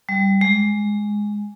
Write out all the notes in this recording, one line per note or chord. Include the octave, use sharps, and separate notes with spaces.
G3
G#3